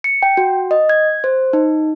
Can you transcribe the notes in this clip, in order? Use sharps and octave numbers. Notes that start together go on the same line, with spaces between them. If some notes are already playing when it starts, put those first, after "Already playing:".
C#7
G5
F#4
D#5
G#6
C5
D#4